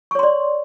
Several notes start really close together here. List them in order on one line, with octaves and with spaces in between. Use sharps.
C#6 C#5 C6 D5